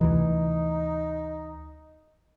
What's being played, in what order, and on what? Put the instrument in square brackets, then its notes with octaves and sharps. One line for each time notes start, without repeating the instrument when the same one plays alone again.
[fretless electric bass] D2 C3 E3 [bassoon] D#4